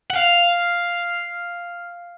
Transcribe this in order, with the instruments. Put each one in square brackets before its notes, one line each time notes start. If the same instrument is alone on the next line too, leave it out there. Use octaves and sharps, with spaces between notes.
[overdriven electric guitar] F#5
F5